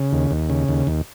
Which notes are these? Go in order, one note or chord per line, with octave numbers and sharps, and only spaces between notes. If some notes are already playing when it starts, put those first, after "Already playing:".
Already playing: C#3
D#2
D#2
C#3
D#2
D#2